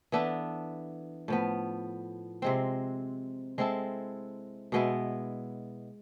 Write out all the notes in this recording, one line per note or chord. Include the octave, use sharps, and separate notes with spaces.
E3 B3 D4 A4
A2 F3 B3
C3 G#3 C4
G#3 C4 E4 A4
B2 G#3 B3 E4